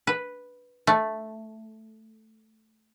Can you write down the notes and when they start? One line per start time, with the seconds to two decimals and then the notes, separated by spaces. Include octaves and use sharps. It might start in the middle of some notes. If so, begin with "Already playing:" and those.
0.07 B4
0.87 A3